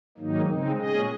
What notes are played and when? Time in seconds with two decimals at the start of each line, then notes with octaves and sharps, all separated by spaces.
0.18 G#2 D#3 F#3 A#3 D#4
0.47 C#3 G#3 C4 D#4
0.77 A#2 G#3 C#4 G#4 D#5